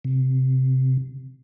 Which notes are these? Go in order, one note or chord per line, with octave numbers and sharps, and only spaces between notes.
C3